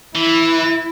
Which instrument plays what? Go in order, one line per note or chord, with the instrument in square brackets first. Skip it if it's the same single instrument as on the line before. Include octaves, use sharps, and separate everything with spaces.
[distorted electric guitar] E3 [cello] E4